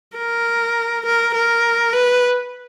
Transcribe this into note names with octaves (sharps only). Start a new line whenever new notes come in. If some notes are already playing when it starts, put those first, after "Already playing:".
A#4
A#4
A#4
B4